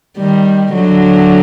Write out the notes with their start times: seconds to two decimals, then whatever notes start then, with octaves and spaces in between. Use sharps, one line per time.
0.18 D#3 G3
0.74 D3 F#3